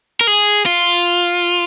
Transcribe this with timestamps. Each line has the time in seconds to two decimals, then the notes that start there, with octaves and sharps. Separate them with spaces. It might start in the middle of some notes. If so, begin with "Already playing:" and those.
0.21 A#4
0.27 G#4
0.66 F4